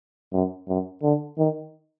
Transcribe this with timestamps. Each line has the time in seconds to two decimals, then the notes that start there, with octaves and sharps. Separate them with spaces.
0.33 F#2
0.68 F#2
1.03 D3
1.38 D#3